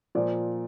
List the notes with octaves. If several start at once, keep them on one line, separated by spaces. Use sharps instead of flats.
A#2 F3 D5